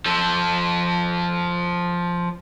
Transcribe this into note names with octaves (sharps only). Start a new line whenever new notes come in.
F3 A4